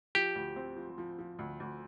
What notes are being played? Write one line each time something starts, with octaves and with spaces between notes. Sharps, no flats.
F3 G4
D2
C4
F3
F3
F3
D2
D2